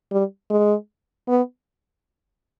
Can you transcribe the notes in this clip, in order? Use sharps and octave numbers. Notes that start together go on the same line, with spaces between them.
G3
G#3
B3